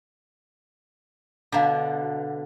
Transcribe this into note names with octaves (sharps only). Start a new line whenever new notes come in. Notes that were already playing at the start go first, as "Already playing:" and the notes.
B2 D3 F5 A#5 D6